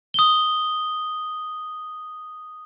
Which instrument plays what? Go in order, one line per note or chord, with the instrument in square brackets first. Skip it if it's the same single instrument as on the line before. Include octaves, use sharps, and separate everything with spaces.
[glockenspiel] D#6 G7